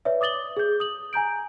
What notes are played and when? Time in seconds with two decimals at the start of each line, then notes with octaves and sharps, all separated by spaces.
0.05 B4 C#5 D5 E5
0.21 D6 D#6 A6 F#7 G7
0.57 G#4 G6
0.80 D#6 F#7
1.13 G#5 A#5 G6 D7